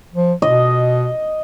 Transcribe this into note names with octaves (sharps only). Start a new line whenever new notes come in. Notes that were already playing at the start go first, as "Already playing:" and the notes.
F3
B2 D#5